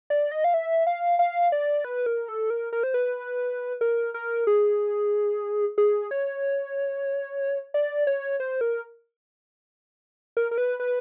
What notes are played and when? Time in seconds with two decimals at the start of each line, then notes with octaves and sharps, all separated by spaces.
0.10 D5
0.32 D#5
0.44 F5
0.54 E5
0.87 F5
1.19 F5
1.52 D5
1.85 B4
2.06 A#4
2.28 A4
2.50 A#4
2.73 A#4
2.83 C5
2.94 B4
3.81 A#4
4.14 A#4
4.47 G#4
5.78 G#4
6.11 C#5
7.74 D5
8.07 C#5
8.40 C5
8.61 A#4
10.37 A#4
10.51 A#4
10.58 B4
10.80 B4